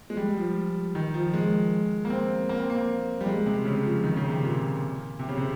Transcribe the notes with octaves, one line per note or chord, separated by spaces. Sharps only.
G#3
G3
F3
D#3
F3
G#3
A#3
C4
A#3
C4
A#3
G3
G#3
C3
C#3
F3
D#3
C#3
C3
A#2
C3
C#3
C3